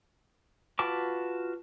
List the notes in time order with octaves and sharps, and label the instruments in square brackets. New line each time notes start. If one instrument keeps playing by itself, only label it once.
[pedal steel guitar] F4 F#4 B4 A5 D6